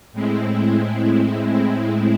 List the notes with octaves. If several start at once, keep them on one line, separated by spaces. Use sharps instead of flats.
A2 G#3 C4 E4